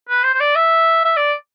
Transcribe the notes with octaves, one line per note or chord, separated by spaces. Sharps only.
B4
C5
C5
D5
E5
E5
D5